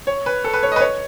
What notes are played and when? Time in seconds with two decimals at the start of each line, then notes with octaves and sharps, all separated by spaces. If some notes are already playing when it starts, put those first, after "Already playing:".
0.07 C#5
0.26 B4
0.44 A4
0.53 B4
0.63 C#5
0.72 D#5
0.76 B4
0.81 C#5